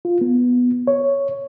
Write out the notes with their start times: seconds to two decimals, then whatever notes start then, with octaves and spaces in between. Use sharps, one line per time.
0.05 F4
0.21 B3
0.87 C#5